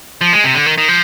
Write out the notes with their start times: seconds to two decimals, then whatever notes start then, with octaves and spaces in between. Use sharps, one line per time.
0.21 F3
0.33 G#3
0.44 C3
0.55 D3
0.66 D#3
0.78 D#3
0.88 F3